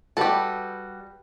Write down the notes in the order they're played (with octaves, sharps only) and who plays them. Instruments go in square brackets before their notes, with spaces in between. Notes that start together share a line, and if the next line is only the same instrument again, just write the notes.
[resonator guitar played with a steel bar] G3 F#4 B4 [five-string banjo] G4 A4